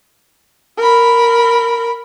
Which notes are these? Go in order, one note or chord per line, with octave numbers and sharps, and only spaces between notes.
A#4 B5